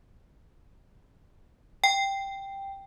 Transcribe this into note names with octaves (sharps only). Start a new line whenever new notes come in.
G5